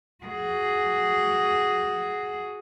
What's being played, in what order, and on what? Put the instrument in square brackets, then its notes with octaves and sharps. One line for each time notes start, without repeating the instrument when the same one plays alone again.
[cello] F#4 G#4